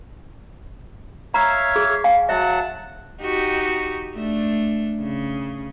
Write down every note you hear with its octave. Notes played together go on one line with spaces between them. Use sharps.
C#5 E5 F5 A#5
G#4
F5 G#5
F#3 E5 F#5 A5
D#4 F#4 G4
A3 D4
C#3